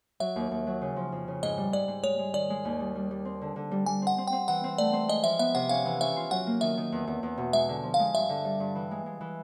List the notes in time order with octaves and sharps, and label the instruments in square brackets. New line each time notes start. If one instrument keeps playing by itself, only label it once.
[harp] F#3 [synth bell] E5
[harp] D#2
D#2
F#3
C#3
F3
F2
C#3
[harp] G#2 [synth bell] D#5
[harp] G3
[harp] G#2 [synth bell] D5
[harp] G#2
[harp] G#3 [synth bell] C#5
[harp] G#3
[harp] D#3 [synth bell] D5
[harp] G#3
D#2
G3
G3
G3
C4
D3
D3
G3
[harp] G3 [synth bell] G#5
[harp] C4 [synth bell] F#5
[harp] C4
[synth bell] G5
[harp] C4
[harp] E3 [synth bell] F#5
[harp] C4
[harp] A3 [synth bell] D5
[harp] C4
[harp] G#3 [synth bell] D#5
[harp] F3 [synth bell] E5
[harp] B3 [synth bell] E5
[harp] C3 [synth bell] F#5
[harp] C#4 [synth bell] F5
[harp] E3
[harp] C#4 [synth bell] E5
[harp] F4
[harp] F#3 [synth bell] F#5
[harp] A#3
[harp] D#3 [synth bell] E5
[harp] D#3
E2
E2
E2
B2
[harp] G#3 [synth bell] E5
[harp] D3
F3
[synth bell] F5
[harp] G#3
[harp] G2 [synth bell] E5
[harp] D3
G3
G2
E3
G#3
G#3
E3